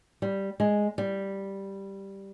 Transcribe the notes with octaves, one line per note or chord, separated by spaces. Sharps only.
G3
G#3
G3